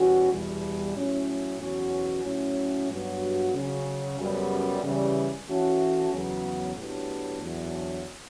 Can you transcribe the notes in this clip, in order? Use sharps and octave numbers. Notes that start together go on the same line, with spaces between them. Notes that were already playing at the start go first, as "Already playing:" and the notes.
Already playing: E2 B2 G3 C#4 F#4
E2 B2 G3
A2 F#3 C#4
E2 B2 F#3 C#4 F#4
A2 F#3 C#4
G2 F#3 B3 F#4
C#3 F#3 C#4
F#2 C#3 G3 B3
C#3 E3 G3
E3 A3 C#4 F#4
E2 C#3 F#3 B3
A2 F#3 B3 D4 G4
E2 D3 F#3